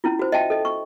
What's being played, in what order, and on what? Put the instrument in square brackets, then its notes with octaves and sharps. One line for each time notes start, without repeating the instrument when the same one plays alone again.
[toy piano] C#4 E4 F4
F#4 C5
D#5 E5 G5 A5
A4 D#5
C#6